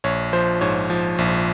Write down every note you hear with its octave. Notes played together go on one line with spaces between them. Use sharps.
A#1 C#5
F3 C5
G#2 C#5
F3
A#1